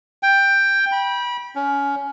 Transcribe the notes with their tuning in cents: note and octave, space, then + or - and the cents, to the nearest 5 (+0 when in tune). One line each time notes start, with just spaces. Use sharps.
G5 +10
B5 -25
C#4 +20